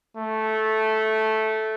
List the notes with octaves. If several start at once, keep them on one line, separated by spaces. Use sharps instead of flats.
A3